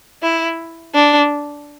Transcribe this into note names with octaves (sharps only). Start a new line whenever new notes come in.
E4
D4